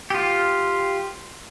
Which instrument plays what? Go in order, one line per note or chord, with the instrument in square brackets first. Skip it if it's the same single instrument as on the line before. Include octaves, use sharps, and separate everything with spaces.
[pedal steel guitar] F4 G4